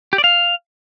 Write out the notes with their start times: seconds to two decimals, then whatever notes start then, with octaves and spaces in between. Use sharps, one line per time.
0.13 G4
0.18 D5
0.24 F5